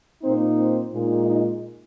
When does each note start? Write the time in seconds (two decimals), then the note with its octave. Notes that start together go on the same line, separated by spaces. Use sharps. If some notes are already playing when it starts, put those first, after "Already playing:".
0.23 A#2 A#3 C4 D#4 C5
0.57 C4 C5
0.91 A#2 G#3 D#4
1.25 D#4 D#5